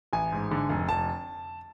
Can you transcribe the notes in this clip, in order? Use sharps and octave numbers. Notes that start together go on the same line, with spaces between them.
A1 G#5
G#2
D3
F1
F1 A5